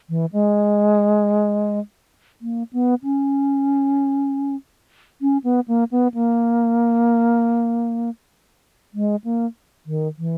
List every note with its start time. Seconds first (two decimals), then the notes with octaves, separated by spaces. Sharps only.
0.09 E3
0.33 G#3
2.41 A#3
2.73 B3
3.04 C#4
5.22 C#4
5.44 B3
5.68 A#3
5.92 B3
6.14 A#3
8.94 G#3
9.24 A#3
9.86 D#3
10.18 E3